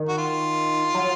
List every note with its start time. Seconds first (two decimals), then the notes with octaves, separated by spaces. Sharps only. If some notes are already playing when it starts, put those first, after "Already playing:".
Already playing: D#3
0.08 F#4
0.18 F4
0.94 F#3